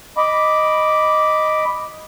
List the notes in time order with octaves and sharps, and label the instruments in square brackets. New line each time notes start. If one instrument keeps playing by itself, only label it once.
[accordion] D#5 B5 D6